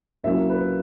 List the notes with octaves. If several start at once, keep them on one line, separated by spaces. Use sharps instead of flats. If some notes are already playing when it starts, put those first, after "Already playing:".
C2 A#2 F#3 A#3 C#4 E5
B4